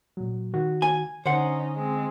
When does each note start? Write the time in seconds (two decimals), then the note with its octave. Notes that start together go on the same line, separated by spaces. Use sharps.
0.17 A#2 F#3
0.53 D#3 F#4
0.82 G#5
1.26 D3 C#4 D#4 C5 F#5
1.76 G#3 C4